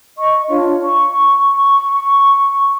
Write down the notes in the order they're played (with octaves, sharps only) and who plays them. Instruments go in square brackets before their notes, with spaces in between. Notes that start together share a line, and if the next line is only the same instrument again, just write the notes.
[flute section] D#5 C#6
D4 F4 C#5
C#6